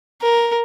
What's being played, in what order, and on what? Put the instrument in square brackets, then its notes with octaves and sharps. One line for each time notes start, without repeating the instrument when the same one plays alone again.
[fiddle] A#4